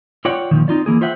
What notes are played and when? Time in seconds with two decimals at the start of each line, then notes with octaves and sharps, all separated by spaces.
0.25 F4 C#5 D5 F#5 G5
0.51 A#2 D#3 F3
0.68 C4 D#4 F4 D5
0.86 E3 A#3 G#4
1.01 F4 C5 E5 F#5 G5